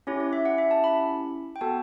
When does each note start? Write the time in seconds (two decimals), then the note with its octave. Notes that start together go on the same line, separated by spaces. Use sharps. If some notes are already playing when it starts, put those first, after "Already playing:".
0.07 C#4 E4 G4 C#5
0.20 C#5
0.33 E5
0.45 F#5
0.58 E5
0.71 A5
0.84 B5
1.56 G5
1.61 B3 F#4 A4 A5